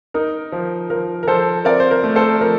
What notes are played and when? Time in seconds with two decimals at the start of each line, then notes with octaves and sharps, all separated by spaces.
0.14 D#4 A#4
0.52 F3
0.90 F3 A#4
1.23 A#4
1.27 F3 A4 C5
1.65 C4 A#4 D5
1.80 C5
1.91 A#4
2.04 A3
2.16 A4 C5
2.40 F3 A#4